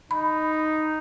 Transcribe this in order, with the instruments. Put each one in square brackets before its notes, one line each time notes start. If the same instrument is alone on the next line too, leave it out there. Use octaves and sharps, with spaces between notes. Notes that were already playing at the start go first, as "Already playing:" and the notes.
[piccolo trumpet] D#4 [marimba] B5